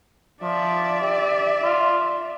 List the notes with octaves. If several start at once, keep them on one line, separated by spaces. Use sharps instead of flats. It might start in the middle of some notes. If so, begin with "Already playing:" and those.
F3 D5 E5
G4
F4